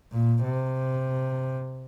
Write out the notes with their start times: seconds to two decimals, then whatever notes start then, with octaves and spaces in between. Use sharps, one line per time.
0.12 A#2
0.44 C3